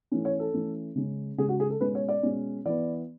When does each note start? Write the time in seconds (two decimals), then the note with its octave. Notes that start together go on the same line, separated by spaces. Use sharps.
0.11 E3 A3 C#4
0.25 C#5
0.39 A4
0.54 E3 A3 C#4
0.95 C#3 G#3 C#4
1.38 C#3 G#3 C#4 G#4
1.49 F#4
1.60 G#4
1.70 A4
1.81 B2 G#3 C#4 B4
1.95 C#5
2.09 D5
2.23 B2 G#3 C#4
2.65 E3 B3 D5